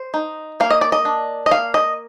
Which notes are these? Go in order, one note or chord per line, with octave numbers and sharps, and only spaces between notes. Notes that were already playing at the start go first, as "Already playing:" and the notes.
Already playing: C5
D#4
A#3 F5
D#5
D5
D#5
D4
D#5
A#3 F5
D#5